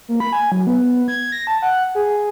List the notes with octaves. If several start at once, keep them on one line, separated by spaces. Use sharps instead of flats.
A#3
B5
G#5
F#3
B3
G#6
A#6
A5
F#5
G#4